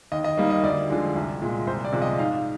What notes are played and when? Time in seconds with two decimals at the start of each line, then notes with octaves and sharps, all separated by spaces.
0.12 D#2 D#5
0.24 D#5
0.37 D#3 G3 A#3
0.50 D#5
0.63 D2 D5
0.90 D3 F3 G#3
1.16 C2
1.42 A#2 G#3
1.67 C2 C5
1.85 D5
1.93 C3 F3 G#3
2.02 D#5
2.19 G#2 F5